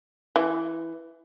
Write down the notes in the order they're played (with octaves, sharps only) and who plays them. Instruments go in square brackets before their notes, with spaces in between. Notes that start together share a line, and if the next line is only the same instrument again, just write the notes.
[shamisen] E3